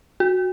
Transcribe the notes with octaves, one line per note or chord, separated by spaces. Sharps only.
F#4